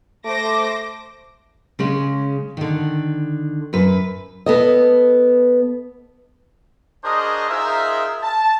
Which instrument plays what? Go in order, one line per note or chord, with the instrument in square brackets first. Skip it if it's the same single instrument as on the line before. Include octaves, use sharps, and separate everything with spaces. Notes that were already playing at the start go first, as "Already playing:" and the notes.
[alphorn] A3 [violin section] C5 D6 A#6
[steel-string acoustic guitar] C#3 G#3 C#4
D3 D#3
F#2 B4
[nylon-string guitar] B3 A4 D#5
[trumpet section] D4 F#4 G#4 A#4 C5 D#5
D#4 F4 G#4 A#4 C5 E5
A5